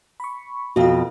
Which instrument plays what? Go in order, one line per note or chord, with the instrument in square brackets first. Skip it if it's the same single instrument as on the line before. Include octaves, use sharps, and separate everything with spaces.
[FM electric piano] B5 C#6
[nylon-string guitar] F2 B2 [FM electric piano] F#4 F5